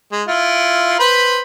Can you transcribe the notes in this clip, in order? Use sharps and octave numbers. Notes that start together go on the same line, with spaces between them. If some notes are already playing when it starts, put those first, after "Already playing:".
G#3
E4 F4
B4 C5 B5